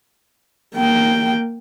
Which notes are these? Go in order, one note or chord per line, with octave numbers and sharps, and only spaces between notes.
A#3 G5